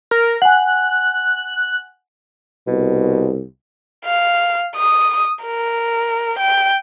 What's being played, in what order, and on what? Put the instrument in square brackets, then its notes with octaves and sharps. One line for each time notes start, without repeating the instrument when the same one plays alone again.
[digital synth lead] A#4
[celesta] F#5 G#5 [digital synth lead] F#6
[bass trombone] C2 [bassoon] B2
[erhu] F5
D#6
A#4
G5